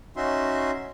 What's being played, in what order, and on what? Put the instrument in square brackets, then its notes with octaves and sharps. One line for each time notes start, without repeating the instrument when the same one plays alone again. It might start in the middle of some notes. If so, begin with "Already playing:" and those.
[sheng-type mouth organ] C#4 D#4 F#4 E5 C6